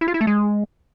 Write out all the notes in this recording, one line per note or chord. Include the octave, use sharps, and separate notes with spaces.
E4
F4
E4
A3
G#3